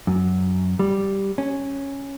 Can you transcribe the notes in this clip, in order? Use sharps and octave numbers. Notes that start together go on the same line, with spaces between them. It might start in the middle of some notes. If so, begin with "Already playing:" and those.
F#2
G3
C#4